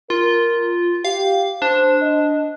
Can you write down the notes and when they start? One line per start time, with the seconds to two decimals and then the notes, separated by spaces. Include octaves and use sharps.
0.10 F4 A#4
1.05 G4 F5
1.62 D4 C5
2.02 D#5